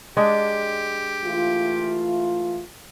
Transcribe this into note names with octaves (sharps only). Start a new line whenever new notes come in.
G#3 D4 G4
E3 A3 F4